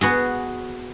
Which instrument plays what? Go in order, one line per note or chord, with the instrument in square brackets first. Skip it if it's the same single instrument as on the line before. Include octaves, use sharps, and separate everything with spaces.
[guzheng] B3 F#4 G#4